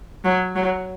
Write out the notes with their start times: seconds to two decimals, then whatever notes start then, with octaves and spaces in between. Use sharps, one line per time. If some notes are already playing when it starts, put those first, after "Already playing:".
0.24 F#3
0.55 F#3